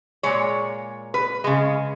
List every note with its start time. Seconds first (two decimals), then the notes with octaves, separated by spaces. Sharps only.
0.23 A#2 G#3 C#5
1.14 B4
1.44 C#3 G#3